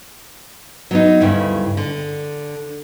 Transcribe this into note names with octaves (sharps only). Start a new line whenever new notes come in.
F#3 B3 D#4
D2 G2 C#3 E4
D3